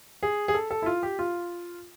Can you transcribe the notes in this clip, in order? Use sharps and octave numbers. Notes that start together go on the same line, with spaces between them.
G#4
G#4
A4
A4
E4
F4
G4
F4